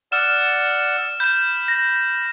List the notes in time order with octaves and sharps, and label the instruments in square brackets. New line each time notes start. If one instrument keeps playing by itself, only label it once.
[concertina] D5 F#5 E6 [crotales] F6 E7
[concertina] B5 [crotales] G6 E7
[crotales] A#6